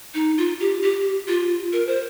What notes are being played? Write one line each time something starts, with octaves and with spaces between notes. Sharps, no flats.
D#4
F4
G4
G4
F4
A#4
C5